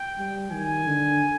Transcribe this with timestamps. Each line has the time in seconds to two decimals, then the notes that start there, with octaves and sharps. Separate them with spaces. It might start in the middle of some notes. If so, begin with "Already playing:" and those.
Already playing: G5
0.18 G3
0.52 D#3 G#5
0.86 D3